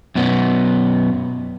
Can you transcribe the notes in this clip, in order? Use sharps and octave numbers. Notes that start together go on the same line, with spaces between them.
F#2 B2 B3 C#4